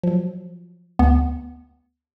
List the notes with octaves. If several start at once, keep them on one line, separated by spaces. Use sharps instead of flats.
F3 F#3
D2 B3